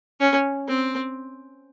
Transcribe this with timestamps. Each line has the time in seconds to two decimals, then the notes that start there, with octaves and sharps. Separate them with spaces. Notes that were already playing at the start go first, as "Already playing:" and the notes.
0.20 C#4
0.68 C4